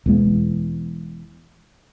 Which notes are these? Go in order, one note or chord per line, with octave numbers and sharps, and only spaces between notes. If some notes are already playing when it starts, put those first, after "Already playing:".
E1 E2 G#3 B3